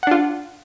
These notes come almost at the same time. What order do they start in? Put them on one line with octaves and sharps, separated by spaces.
F#5 D4 F4